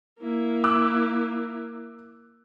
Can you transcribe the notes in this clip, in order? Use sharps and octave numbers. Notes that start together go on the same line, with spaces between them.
A#3 E4
D6 E6 F#6